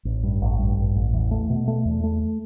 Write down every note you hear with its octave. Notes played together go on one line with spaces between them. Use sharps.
A1
G2
A1
G2
A1
A1
E2
A3
B2
A3
E2
A3